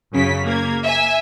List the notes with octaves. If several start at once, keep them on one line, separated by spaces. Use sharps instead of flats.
F#2 C#3 B6
A#3 G#6
E5 G#5